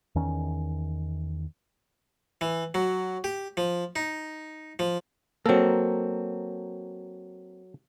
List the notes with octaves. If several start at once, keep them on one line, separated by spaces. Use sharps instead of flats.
E2 D#3 C#4
E3
F#3
G4
F3
D#4
F3
F#3 A#3 C4 A4